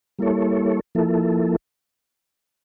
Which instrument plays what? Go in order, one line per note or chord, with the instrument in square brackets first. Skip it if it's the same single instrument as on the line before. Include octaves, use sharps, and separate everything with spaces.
[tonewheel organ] G3 A#3 E4 A4 C#5
F3 A#3 E4 A4